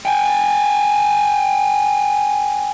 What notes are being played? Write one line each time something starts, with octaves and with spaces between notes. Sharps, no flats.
G5 G#5